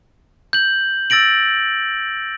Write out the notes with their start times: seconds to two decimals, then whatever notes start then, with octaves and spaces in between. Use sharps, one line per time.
0.53 G6 F#7
1.10 E6 A6 A#6 D7 F#7